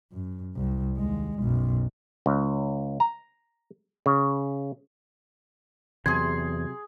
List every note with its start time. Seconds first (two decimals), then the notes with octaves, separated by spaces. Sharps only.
0.12 F#2
0.56 C2
0.97 D#2 G#3
1.39 B1 F#2
2.26 C#2
3.00 A#5
4.06 C#3
6.06 E2 C3 F#3 G#4 C6 G#6